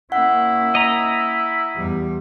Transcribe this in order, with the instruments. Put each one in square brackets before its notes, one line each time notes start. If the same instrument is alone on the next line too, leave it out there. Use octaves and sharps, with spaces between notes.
[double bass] A#3 C#4 [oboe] E4 [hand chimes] F#5
[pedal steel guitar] D#5 A#5
[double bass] E2 G3